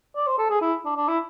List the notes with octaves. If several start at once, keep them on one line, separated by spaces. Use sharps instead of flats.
D5
C5
A4
G#4
E4
D4
D4
E4